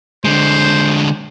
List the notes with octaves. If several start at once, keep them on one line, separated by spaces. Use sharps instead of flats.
D3 G#3 C5